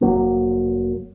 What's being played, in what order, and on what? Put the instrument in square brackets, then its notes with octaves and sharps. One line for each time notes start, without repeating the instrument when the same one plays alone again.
[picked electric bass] F1 F2 F#3 A#3